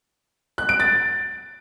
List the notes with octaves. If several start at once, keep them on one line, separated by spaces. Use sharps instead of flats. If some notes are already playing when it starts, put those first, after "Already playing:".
F#6
D7
A6